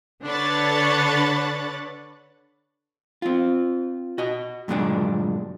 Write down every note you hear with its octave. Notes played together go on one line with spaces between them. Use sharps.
D3 D4 B4 C#5 F#6 A6
C4 F4
F#4 D#5
G2 A#2 D3 F#3 G#3 D4